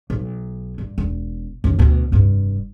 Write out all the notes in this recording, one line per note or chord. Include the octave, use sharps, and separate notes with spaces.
B1
G2
E1
F#2 D#3
D2 B2
F1 G2